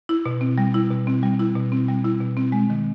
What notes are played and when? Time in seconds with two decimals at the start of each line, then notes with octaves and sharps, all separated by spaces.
0.09 E4
0.26 B2
0.41 C4
0.58 G3
0.74 E4
0.90 B2
1.07 C4
1.23 G3
1.39 E4
1.55 B2
1.72 C4
1.88 G3
2.04 E4
2.20 B2
2.37 C4
2.52 G#3
2.70 D#3